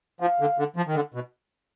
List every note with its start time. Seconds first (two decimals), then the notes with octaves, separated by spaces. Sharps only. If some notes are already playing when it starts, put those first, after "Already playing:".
0.21 F3 F5
0.40 D3
0.58 D3
0.76 F3
0.87 D#3
0.95 D3
1.14 B2